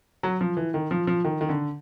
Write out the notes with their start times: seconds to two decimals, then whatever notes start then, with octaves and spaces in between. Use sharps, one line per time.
0.23 F#3
0.41 F3
0.57 E3
0.74 D#3
0.91 F3
1.07 F3
1.25 D#3
1.41 D#3
1.49 D3